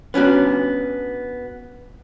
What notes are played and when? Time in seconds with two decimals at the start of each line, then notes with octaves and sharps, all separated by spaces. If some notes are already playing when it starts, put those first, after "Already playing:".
0.14 B3 C#4 D4 F#4